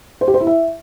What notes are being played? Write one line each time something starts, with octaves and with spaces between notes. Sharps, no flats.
C5
G4
C5
E4
E5